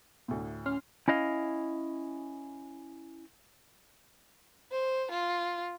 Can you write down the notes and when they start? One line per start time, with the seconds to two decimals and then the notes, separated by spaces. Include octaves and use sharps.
0.28 D2 A2
0.66 C#4 C6 F6
1.08 C#4 E4 D#5 F5
4.71 C5
5.11 F4